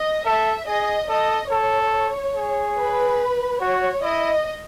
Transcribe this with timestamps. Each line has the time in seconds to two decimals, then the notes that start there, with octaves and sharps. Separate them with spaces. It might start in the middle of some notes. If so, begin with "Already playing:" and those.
Already playing: D#5
0.26 A4 E5
0.67 G#4 D#5
1.09 A4 D#5
1.51 A4 C#5
2.35 G#4
2.77 B4
3.61 F#4 C#5
4.03 E4 D#5